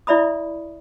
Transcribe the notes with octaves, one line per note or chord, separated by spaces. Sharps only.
E4 D5 E5 B5 D#6